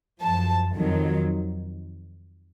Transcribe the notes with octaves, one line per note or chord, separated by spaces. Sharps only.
F#2 F3 A5
F2 D#3 F#3